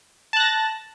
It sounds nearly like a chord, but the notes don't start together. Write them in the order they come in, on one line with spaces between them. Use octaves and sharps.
A5 F#6 A#6 A6